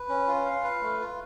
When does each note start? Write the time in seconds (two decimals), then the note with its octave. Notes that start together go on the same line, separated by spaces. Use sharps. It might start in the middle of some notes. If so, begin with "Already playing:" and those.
Already playing: B4
0.09 C#4
0.28 F4
0.46 F5
0.64 B4
0.82 A3
1.00 F4